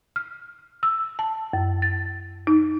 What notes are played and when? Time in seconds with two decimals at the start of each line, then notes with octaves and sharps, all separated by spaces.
0.16 F6
0.83 E6
1.19 A5
1.53 F#2
1.82 A6
2.47 D#4